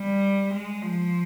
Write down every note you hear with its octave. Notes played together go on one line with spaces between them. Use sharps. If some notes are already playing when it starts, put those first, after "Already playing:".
Already playing: G3
G#3
F3